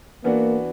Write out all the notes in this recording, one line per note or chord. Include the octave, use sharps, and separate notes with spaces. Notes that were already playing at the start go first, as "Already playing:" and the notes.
E3 A#3 B3 D4 F#4